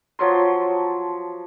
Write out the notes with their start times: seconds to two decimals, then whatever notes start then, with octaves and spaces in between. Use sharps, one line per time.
0.19 F3 F#3 C6